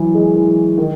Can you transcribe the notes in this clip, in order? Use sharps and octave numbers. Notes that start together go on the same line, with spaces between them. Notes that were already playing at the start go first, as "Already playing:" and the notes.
Already playing: E3 F#3
G#3
E3
D#3